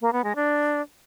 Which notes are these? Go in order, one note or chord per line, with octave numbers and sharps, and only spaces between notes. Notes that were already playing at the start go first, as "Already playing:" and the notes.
A#3
B3
G#3
D4